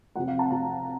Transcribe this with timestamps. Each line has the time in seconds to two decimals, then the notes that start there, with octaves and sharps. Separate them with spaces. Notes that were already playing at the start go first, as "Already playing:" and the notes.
0.15 F2 C3 F3 F#5
0.28 F5
0.39 A5
0.50 F2 C3 F3 A#5